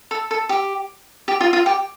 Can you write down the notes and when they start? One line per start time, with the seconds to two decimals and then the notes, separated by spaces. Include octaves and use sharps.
0.11 A4
0.31 A4
0.49 G4
1.28 G4
1.41 F4
1.53 F4
1.66 G4